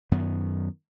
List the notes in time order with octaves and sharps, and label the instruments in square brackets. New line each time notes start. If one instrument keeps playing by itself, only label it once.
[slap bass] F#2 D#3 B3